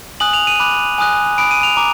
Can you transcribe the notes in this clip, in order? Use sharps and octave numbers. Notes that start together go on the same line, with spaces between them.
G#5 D#6 F#6 F#7
F7
D#7
B5 D6 F#6
G#5 D#6 F#6
B5 D#6 F#6 D7
D#7
F7
A#5 D6